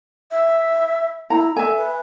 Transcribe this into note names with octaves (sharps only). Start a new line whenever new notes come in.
E5
E4 A#5
A4 E5 G#5
B4